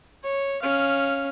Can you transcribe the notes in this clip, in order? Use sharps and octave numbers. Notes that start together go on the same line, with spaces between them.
C#5
C#4 F5